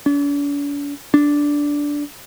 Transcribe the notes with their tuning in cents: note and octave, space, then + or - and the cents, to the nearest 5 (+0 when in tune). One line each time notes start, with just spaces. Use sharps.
D4 -45
D4 -10